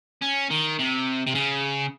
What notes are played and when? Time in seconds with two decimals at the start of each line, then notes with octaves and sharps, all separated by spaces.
0.22 C#4
0.51 D#3
0.79 C3
1.27 C3
1.35 C#3